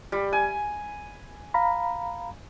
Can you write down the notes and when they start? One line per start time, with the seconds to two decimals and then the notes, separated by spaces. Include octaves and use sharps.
0.12 G3
0.33 G#5
1.54 F5 A#5 B5